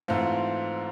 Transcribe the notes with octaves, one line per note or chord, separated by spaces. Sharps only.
G#2 E3 A3 C4 F4